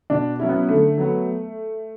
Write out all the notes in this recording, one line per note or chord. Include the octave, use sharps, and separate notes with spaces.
B2 D4
F#3 C#4 E4
B3
D3 A3
F#3 B3